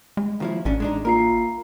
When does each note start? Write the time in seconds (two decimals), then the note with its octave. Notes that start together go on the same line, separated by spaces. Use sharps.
0.17 G#3
0.40 D#2 F3 E4
0.65 A1 G#2 C#4 D4
0.80 G#3 D4 D#4
1.05 A#3 F4 A#4 C7